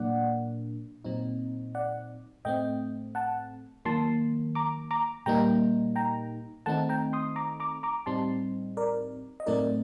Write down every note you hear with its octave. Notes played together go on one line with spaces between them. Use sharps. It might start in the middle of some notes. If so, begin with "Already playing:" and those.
Already playing: A#2 F#3 A#3 D4 D5 F#5
A#2 F#3 C4 D#4
D5 F#5
A2 A3 C4 D#5 G5
F#5 A5
D#3 F#3 A#3 A5 C6
A#5 D6
A#5 D6
A#2 G3 A#3 D#4 G5 A#5
G5 A#5
D#3 A3 C4 D#4 F#5 A5
G5 A#5
C6 D#6
A#5 D6
A#5 D6
A#5 D6
A2 G3 C4 D#4 A5 C6
A#4 D5
D#5
A2 F#3 A3 C4 D#4 A#4 D5